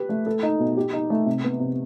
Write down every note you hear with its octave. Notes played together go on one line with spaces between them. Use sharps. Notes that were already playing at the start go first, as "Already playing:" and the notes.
Already playing: G4 B4
A3
A4
D#4
B2
G4
D#4
A3
C3
B3
C3